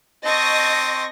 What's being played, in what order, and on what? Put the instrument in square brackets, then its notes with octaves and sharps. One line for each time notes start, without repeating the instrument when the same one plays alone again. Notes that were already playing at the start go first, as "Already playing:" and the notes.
[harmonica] C4 [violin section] D#5 C#6 A#6 [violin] A5 D#6